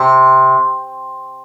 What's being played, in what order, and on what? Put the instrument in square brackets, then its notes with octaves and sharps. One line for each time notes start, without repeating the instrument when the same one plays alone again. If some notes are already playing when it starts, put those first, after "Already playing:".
Already playing: [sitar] C3